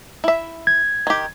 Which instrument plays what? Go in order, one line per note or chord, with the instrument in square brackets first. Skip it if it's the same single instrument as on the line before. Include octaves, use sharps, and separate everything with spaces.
[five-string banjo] E4 E5
[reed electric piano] G#6
[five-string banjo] D#3 G4